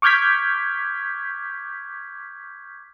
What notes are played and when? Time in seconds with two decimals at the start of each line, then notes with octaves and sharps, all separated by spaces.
0.02 C#6 D6 F6 G6 G#6 B6